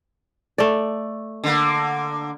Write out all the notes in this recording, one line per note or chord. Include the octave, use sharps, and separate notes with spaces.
A3 D5
D3 A#3